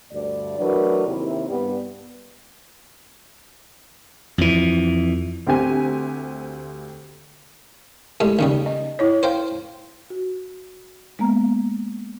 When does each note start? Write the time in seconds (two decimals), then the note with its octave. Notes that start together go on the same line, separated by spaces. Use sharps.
0.11 D2 G2 D5
0.59 E3 F#3 A3 D4 A#4 B4
1.06 D#2 C3 D#3 E4
1.49 G2 G3 B3
4.38 F2 E3
5.47 D2 C4 G4 G#5
8.20 A2 G#3 G4
8.39 D#2 C#3 G3
8.66 D#5
8.99 E4 C#5
9.23 C5 F5 G5
10.10 F#4
11.19 G#3 A#3 B3 A#5